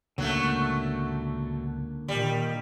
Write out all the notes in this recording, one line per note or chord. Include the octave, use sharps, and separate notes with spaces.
C#2 A2 D3 F#3 A3 A#3 F#5
A#2 D#3 G3